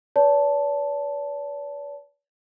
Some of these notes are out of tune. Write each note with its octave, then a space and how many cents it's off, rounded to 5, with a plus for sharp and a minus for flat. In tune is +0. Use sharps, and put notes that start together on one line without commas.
B4 +0 D5 -45 A5 +0